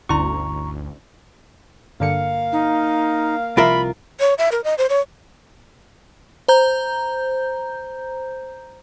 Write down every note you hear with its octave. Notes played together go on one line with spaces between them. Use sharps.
G1 D2 D3 C#4 E4 A#5 C6 C#6
G2 D3 A#3 F5 C#7
D#4
C2 F3 F4 A#4 E5 B5 D7
C#5
E5
A#4
D#5
C5
C#5
C5 A#5 G6